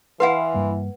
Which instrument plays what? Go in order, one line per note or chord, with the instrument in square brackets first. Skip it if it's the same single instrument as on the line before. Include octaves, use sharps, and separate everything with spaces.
[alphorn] E3 [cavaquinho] E4 F5 C6 [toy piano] B4 F#5
[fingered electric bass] G2 G3 A#3